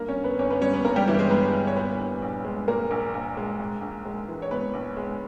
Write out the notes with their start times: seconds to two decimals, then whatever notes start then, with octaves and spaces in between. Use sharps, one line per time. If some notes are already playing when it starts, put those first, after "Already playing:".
Already playing: G2 A#3 A#4
0.08 C#4 C#5
0.16 G1
0.24 B3 B4
0.39 G1 C#4 C#5
0.50 B3 B4
0.61 G3 C#4 C#5
0.73 B3 B4
0.85 G2 A#3 A#4
0.96 G3 G4
1.08 G1 E3 E4
1.19 G#3 G#4
1.30 G1 B3 B4
1.53 G3
1.67 C#5
1.76 A#2 B3 B4
1.99 A#1
2.22 A#1
2.45 G#3
2.68 A#2 A#3 A#4
2.91 A#1
3.14 A#1
3.37 G#3
3.60 G#2
3.82 A#1
4.05 G#3
4.28 E3
4.42 C#5
4.51 G#2 B3 B4
4.74 A#1
4.97 G#3